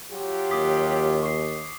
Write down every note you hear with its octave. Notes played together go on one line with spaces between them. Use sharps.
F#3 F4 G4
D#2 D6 D#6 B6
C#6 C7